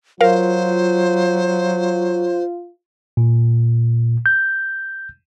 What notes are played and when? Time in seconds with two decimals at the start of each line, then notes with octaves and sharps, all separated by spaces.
0.21 F#3 F4 A#4 C5 F5
3.17 A#2
4.26 G6